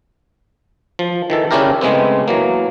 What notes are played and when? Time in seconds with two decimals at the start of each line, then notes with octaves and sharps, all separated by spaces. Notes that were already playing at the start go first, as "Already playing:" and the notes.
0.99 F3
1.30 D#3 E3 A4
1.51 C#3 C#4 D4 E4 G4 A#4
1.81 C#3 G#3 A3 B3 C4
2.28 E3 F#3 A#3